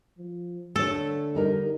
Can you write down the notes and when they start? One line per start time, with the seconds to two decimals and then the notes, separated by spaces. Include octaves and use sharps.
0.18 F3
0.76 D3 A3 A4 C#5
1.35 G3 D#4 A#4